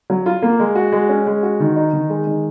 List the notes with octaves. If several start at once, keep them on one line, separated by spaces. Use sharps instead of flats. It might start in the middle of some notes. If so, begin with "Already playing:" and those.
F#3
F4
A#3
G#3
F#4
G#3
C#4
G#3
F#4
D#3
D#4
D#3
G#3
D#3